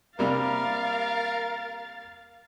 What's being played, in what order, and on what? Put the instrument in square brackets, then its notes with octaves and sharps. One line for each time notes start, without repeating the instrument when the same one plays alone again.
[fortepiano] C3 G3 A#3 [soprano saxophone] A#4 [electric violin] F5 A6